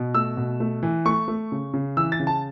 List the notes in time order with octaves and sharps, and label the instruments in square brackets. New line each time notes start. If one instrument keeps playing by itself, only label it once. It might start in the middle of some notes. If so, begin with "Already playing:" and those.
Already playing: [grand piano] B2
A3 E6
B2
A3
E3
A3 C#6
A3
C#3
C#3
E3 E6
A6
C#3
A5